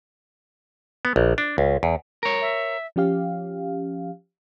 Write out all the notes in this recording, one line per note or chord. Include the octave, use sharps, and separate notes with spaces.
B3
A#1
D4
C#2
E2
A#4 C#5
E5
F3 C#4 G4 F5